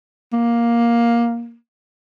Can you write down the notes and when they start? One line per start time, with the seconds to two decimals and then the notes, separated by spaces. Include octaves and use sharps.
0.33 A#3